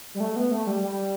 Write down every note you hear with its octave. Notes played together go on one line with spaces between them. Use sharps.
G3
A3
B3
A3
G3
G3